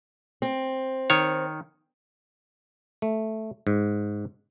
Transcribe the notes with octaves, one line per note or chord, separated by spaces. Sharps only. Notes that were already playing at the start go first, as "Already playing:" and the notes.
C4
D#3 C#5
A3
G#2